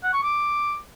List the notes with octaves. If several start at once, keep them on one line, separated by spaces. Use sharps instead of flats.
F#5
C#6
D6